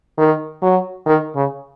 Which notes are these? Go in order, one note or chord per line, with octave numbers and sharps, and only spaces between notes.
D#3
F#3
D#3
C#3